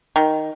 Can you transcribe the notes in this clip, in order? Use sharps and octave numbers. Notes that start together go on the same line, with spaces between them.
D#3